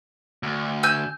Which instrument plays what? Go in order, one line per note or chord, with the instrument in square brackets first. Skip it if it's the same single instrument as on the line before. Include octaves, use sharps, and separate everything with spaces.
[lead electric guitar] D2
[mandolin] G#5 E6 G6